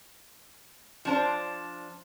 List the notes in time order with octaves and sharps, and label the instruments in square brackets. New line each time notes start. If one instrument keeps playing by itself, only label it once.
[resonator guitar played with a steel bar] F3 D4 C5